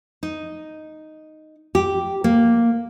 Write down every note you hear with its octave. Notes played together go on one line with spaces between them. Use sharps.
D#4
G4
A#3